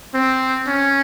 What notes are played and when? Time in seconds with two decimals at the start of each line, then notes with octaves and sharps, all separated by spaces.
0.14 C4
0.66 C#4